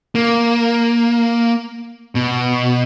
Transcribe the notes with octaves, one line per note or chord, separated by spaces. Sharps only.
A#3
B2